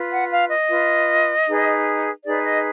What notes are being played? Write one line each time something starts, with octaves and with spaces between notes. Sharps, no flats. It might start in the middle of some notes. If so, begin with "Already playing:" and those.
Already playing: F4 B4
F#5
F5
D#5
F4 B4
D#4 G#4 B4
D#4 G#4 B4 D5
D#5